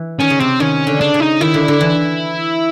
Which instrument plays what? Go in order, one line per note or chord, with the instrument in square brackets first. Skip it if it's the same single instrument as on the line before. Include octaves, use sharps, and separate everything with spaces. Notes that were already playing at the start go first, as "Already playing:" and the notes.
Already playing: [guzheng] E3
[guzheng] D#3 [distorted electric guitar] C#4
[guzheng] C#3
[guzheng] C3 [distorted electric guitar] C4
[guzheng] D#3 [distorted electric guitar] C#4
[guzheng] D3
[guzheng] C#3 [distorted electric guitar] D4
[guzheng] C#3
[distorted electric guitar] D#4
[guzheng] D#3 [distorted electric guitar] E4
[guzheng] D3
D3
E3